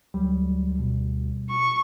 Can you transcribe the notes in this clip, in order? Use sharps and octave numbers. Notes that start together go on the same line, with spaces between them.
D2 F#3 G3
B2
C#6